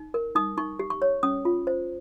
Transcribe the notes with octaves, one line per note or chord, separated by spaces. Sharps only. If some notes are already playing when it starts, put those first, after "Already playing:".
Already playing: D#4
A#4
D#4 D#6
D#4 C#6
G4
C#6
C#5
C#4 D#6
F4
C5